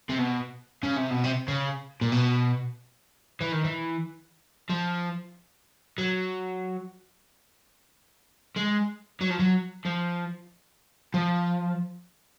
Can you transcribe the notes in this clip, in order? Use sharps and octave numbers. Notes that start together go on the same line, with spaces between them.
C3
B2
C#3
C3
B2
C3
C#3
A#2
B2
E3
D#3
E3
F3
F#3
G#3
F#3
F3
F#3
F3
F3